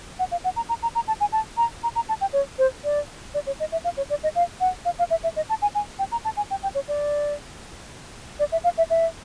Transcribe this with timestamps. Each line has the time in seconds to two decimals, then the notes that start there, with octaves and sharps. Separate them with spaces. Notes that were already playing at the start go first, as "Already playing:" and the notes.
0.19 F#5
0.32 F5
0.44 F#5
0.56 A#5
0.69 A#5
0.83 A#5
0.95 A#5
1.08 A5
1.21 G#5
1.32 A5
1.57 A#5
1.83 A#5
1.95 A#5
2.09 A5
2.21 G5
2.33 C#5
2.59 C5
2.84 D5
3.34 D5
3.47 C#5
3.60 D#5
3.72 E5
3.84 F5
3.97 C#5
4.10 D5
4.23 D#5
4.35 F5
4.61 F#5
4.85 F5
4.99 F5
5.11 E5
5.24 E5
5.36 D#5
5.49 A5
5.62 G#5
5.75 G#5
5.99 G5
6.12 A#5
6.25 A5
6.37 G#5
6.51 G5
6.63 G5
6.75 C#5
6.88 D5
8.40 D5
8.52 E5
8.64 F5
8.78 E5
8.90 E5